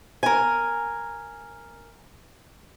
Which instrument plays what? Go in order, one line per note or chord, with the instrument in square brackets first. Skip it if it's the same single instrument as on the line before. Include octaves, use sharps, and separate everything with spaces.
[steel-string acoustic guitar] A#4 G#5